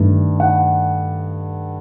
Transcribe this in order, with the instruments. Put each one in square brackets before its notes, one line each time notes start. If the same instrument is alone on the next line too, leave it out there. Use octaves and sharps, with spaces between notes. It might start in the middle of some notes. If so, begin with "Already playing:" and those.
Already playing: [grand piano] G2 D#3 A3
F#5